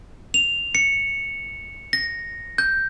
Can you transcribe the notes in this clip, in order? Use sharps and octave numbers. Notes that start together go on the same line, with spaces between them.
F7
C#7
A#6
G6